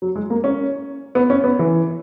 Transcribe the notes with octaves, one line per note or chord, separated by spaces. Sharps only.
F#3
G#3
A#3
C#4
B3
C#4
B3
E3